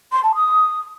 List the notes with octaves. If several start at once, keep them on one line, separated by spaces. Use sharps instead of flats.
C6
A5
D#6